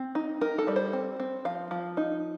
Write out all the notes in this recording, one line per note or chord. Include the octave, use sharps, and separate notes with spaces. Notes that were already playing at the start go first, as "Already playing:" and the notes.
Already playing: C4
D#4
D#4 A#4
A4
G3 D5
C5
C4
C4
F3 F5
F3
D#4